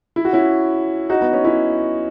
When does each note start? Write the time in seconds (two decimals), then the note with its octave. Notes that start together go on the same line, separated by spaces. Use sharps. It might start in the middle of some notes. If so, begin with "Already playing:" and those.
0.16 E4
0.25 F#4
0.33 C#4 E4
1.10 D#4 F#4
1.21 B3
1.33 C#4
1.44 C#4 E4